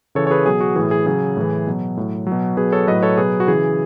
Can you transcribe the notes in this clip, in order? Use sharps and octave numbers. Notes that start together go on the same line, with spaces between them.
C#3 E3 A4 C#5
C#5
G#4 B4
B2 F#3 G#4
F#4
A2 E3 G#4
G#4
C#3 F#3 G#4
A2 E3
B2 F#3
A2 F#3
F#3
B2
B2 F#3 G#4 B4
A4 C#5
A2 F#3 B4 D#5
A4 C#5
B2 F#3 G#4 B4
F#4
C#3 E3 G#4